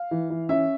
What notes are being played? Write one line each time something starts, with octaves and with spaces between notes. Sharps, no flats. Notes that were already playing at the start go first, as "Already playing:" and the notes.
Already playing: F5
E3
E3
C#4 E5